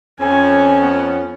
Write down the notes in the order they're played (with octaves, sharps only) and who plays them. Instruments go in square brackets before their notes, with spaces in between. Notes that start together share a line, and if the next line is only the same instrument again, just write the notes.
[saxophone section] F2 C#4 [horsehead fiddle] G#5
[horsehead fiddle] B3